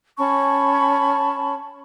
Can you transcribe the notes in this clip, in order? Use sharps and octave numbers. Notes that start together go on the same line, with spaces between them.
C#4 A5 B5 C#6